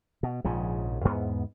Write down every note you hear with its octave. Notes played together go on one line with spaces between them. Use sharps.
B2
A#1 G#2 C#3 F3
E2 G#2 B3